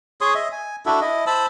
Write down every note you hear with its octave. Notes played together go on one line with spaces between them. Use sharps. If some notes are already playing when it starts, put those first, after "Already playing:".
G#4 C#5 C6 D#6
D#5 E5
G#5
D4 E4 F#4 A4
E4 D#5
C5 A5 B5 E6